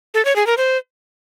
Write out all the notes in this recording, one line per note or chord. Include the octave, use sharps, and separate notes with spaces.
A4
C#5
G#4
A#4
C5